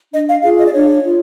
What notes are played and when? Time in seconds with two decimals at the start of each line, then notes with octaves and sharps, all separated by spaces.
0.12 D4 D#5
0.28 F5
0.43 F4 G#4 F5
0.58 D#5
0.66 D5
0.73 D4 C#5
1.04 F4